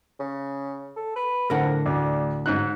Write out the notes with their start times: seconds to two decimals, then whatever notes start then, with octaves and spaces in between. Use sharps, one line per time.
0.20 C#3
0.96 A4
1.16 B4
1.50 F2 A2 D3 A#4 F#5
1.86 D2 D4
2.46 G#2 F#3 D#4 F#6